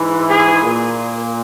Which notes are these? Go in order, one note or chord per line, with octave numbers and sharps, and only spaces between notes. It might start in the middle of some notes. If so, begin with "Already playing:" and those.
Already playing: G#2 E3
G#4
A#2